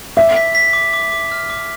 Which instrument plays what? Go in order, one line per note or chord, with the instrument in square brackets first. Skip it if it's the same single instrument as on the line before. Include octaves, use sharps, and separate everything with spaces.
[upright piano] E5 [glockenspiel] D6
[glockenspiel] B6
B6
D6
D6
D6
F6
D6